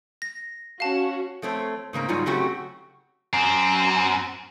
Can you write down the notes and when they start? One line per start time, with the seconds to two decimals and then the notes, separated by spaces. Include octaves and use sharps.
0.22 A#6
0.80 C#4 F#4 F5 A5
1.42 F3 A3 C4 C#5
1.93 G#2 C#3 A#3 C4
2.08 G#2 F#3 G3 D#4 F4
2.26 C#3 F#3 A3 C4 F#4 G4
3.33 F#2 C4